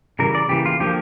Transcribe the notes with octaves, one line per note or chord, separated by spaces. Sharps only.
C#3 E3 G3 A#4
D5
C#3 E3 A#3 G4
F4
D3 F3 A#3 G4